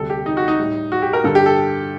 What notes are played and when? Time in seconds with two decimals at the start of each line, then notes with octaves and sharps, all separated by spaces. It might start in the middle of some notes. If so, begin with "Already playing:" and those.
Already playing: D2 C3 G3 A4
0.10 G4
0.26 D#4
0.37 F#4
0.48 D#4
0.59 A2 G3
0.92 F#4
1.02 G4
1.13 A#4
1.24 G2 D3 G3 A4
1.35 G4
1.46 A4